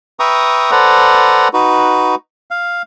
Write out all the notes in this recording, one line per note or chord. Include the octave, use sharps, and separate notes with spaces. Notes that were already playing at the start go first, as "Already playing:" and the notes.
B4 E5 G5 A#5 C#6 D#6
A4 B4 C5 D5 F#5 A#5
D#4 F#4 B4
F5